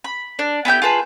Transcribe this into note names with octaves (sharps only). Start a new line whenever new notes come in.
B5
D4
B3 E4 G4 G6
F4 G#4 B4 A5